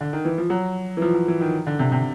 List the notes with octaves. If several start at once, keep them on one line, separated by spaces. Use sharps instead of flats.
D3
D#3
E3
F3
F#3
E3
F3
F3
E3
D#3
D3
C3
C3